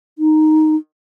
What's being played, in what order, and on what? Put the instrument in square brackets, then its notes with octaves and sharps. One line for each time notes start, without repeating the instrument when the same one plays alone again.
[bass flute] D#4